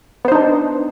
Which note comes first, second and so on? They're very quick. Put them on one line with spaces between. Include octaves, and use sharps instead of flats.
B3 C5 D#4 D4